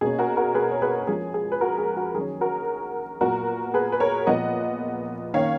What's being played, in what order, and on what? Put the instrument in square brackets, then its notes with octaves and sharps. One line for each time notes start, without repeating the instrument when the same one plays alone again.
[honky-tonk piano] B2 A#3 C#4 G#4
F#4 A#4
F#4 A#4
G#4 B4
C#5
G#4 B4
F3 G#3 C#4 G#4
G#4
B4
F#4 A#4
G#4
F#4
D#3 F#3 C#4 G#4
F#4 A#4
A#2 F#3 B3 F#4 A#4
G#4 B4
B4
A#4 C#5
A#2 F3 B3 D#5 F#5
D#3 A#3 C#4 C#5 F5